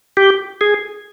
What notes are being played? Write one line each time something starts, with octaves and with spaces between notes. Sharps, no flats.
G4
G#4